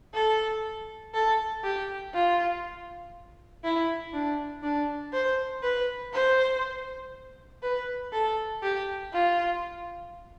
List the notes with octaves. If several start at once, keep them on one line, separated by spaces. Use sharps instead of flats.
A4
A4
G4
F4
E4
D4
D4
C5
B4
C5
B4
A4
G4
F4